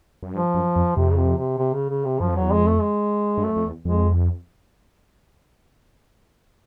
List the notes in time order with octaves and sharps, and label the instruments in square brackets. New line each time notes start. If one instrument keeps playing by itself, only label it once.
[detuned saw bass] F#2
[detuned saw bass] G2 [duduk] F3
[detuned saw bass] F#2
F2
[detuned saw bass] F2 [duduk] C3
[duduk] C#3
C3
C3
C3
C#3
C#3
C3
[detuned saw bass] F#2 [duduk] F3
[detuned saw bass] F2
[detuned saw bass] E2 [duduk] F#3
[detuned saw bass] F2 [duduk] G#3
[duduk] A3
G#3
[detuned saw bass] G2
[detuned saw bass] F#2 [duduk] A3
[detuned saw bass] F2
E2
[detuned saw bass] F2 [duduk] G#3